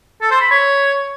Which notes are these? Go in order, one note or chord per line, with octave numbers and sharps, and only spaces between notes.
A4
C5
B5
C#5